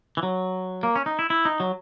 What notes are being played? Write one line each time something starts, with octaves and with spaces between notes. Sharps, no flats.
E3
F#3
A#3
C#4
D#4
E4
E4
D#4
F#3